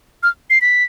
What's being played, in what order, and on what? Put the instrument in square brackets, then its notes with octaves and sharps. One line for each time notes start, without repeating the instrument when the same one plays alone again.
[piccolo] F6
C7
B6